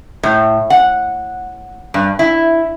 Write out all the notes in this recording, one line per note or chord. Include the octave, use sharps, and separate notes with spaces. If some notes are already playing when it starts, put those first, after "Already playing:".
A2
F#5
G2
E4